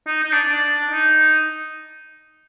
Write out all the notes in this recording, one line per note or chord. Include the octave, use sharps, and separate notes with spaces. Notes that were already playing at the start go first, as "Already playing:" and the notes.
D#4
D#4
D4
D4
D#4